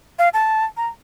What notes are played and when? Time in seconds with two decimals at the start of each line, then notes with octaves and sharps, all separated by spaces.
0.19 F5
0.34 A5
0.77 A#5